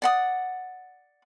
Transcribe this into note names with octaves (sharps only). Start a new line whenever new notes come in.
D5 F#5 D#6